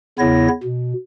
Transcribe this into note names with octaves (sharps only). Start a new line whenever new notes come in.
E2 C#3 B3 E4 C#5 A#6
B2